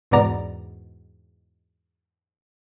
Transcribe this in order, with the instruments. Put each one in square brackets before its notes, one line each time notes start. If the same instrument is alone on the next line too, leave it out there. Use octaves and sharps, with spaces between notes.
[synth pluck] E2 G#2 B2 B3 D5 A#5